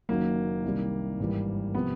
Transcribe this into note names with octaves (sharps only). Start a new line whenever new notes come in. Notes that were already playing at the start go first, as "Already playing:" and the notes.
F#1 F#2 D#3 F#3 A#3
C2 C3 D#3 G3
G#1 G2 E3 G3
C3 F3 B3